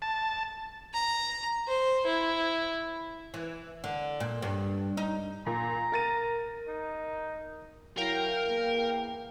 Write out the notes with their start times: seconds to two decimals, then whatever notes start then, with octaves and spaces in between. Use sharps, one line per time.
0.02 A5
0.94 A#5
1.68 C5
2.07 E4
3.34 E3
3.84 D3
4.20 A#2
4.42 G2
4.97 D#4
5.46 A#2 A#5
5.92 A#4 A6 D#7
6.68 D#4
7.97 F#3 E4 A#4 F5 G5 A#5
8.47 E2 A#3